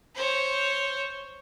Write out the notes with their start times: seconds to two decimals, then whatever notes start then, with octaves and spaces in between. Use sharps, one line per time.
0.15 C5 C#5